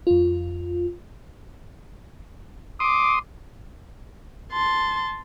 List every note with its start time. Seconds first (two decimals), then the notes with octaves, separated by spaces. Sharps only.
0.07 F2 F4
2.80 C6 D6 D#6
4.52 A5 C6